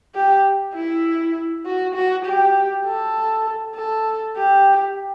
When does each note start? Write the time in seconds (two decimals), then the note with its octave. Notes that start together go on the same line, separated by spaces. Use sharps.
0.15 G4
0.75 E4
1.66 F#4
1.95 F#4
2.25 G4
2.86 A4
3.75 A4
4.37 G4